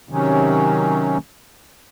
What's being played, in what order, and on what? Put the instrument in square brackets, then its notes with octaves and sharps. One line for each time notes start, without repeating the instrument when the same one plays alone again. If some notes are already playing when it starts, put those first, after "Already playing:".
[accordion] C3 D#3 F#3 C#4